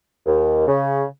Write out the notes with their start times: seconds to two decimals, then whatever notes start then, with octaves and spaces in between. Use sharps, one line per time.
0.26 D#2
0.67 C#3